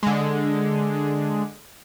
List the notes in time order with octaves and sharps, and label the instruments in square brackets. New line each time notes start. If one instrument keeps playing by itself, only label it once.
[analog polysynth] D3 G#3